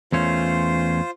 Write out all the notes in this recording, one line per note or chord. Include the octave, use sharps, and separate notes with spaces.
E2 A3 C#4 F4 C5